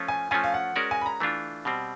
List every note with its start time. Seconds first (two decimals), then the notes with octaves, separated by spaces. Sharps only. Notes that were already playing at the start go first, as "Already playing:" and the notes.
Already playing: F3 A3 C#4 F4
0.08 G#5
0.31 F3 A3 C#4 F4 G#5
0.44 F5
0.54 F#5
0.76 G#3 C#4 F#4 A#4 D5
0.91 G#5
1.01 B5
1.06 A#5
1.20 E3 A3 D4 F4
1.65 B2 G3 C4